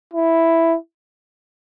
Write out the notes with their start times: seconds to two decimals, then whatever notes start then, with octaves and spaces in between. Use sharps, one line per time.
0.14 E4